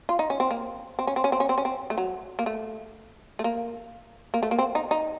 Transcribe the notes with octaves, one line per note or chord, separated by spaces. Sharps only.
F4
D#4
C#4
C4
A#3
C4
C#4
C4
C#4
C4
C#4
C4
C#4
C4
A3
F#3
A#3
A3
A3
A#3
A#3
A3
A#3
C4
D#4
D#4